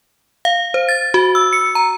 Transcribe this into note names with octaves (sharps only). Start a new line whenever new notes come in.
F5
C5
A6
F#4
E6
C#7
A#5